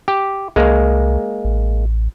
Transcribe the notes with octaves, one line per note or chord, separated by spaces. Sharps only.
G4
C2 G#3 A#3
A1